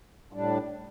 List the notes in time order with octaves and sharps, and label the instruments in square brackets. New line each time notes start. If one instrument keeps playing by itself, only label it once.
[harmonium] A2 G3 D4